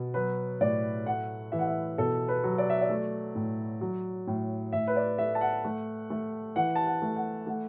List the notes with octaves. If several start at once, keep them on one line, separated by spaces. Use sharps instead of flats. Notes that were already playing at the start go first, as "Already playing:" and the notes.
Already playing: B2
F#3 B4
A2 D5
A3 F#5
E3 E5
F#5
E5
B2 A4
B4
F#3
D5
E5
D5
A3
A2
F#3
A2
A2 E5
B4
D5
A3 E5
A5
F#5
A3
A3
E3 F#5
A5
F#5
A3
F#5
A3 F#5